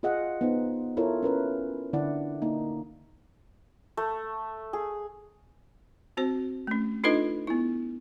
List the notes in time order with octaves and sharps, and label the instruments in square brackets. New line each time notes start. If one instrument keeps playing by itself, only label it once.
[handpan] F4 G#4 D#5 F5 F#5
B3 D#4 C5
E4 F4 A4 A#4 C#5
C#4 A#4 B4
D3 D4 E4 D5 F#5
A#3 D#4
[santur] A3
G#4
[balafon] C4 F#4 C5
A3 C#4
D4 D#4 F4 A4 B4 D#5
B3 E4